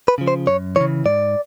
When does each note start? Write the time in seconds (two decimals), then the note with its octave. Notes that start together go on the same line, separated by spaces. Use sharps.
0.08 B4
0.18 C#3 F3
0.28 C5
0.47 F#2 C#5
0.76 C#3 E3 C#5
1.05 G#2 D5